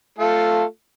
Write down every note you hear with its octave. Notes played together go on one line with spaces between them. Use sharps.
A3 F4 A4